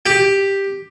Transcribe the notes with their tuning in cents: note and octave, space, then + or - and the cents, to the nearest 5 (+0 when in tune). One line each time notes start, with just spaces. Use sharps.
G4 +5